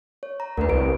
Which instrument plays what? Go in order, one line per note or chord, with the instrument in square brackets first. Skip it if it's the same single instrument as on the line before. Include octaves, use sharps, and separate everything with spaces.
[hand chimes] C#5
A#5
[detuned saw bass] D2 [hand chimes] A#4 B4
[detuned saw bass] C2 [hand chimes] G4 A#4 D7